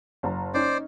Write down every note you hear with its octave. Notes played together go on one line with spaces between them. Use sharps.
F#1 A5 A#5
C#4 D#4 C5 D5